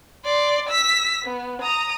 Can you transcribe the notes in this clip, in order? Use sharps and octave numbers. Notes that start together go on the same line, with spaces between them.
D5 C6
E6 B6
B3
A#5 D#6